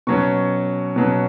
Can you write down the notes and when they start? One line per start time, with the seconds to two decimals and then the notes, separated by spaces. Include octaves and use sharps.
0.07 B2 F#3 C#4 C#6
0.96 B2 F#3 C#4